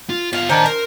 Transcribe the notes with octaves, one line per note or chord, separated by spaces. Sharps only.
F4
B3 F4 F5
D#3 D4 C5 G#5 A#5
A#4 C5